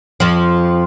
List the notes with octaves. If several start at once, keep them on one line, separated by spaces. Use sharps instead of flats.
F2 F3